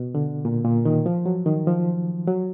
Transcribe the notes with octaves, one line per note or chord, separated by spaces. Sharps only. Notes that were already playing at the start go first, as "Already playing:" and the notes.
Already playing: B2
D3
A#2
A#2
D#3
F3
F#3
D#3
F3
F#3